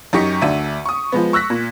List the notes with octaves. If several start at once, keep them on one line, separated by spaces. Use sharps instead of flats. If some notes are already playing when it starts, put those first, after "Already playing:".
F#2 D#4 G4 C#6 B6 C#7
D2 D4 E5 D#7
C#6 D#6
F3 G#3 B3
C#6 E6 F#6 A#6 B6
A#2